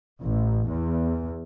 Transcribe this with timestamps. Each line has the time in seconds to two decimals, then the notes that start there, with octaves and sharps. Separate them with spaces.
0.23 A1
0.69 E2